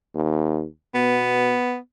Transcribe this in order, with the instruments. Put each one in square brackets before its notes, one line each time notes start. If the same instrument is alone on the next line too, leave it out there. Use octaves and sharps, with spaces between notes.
[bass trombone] D#2
[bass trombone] B2 [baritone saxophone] B3